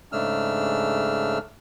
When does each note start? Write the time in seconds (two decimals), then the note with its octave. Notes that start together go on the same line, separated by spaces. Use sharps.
0.12 G#2 C#3 A3 D4 E6 F6